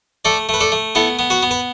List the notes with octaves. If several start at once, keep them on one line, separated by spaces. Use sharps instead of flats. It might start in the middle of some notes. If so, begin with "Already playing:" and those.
A3 A4 D5
A3 B4
A4 D5
A3
B3 E4 A4
B3
F#4 B4
B3
B4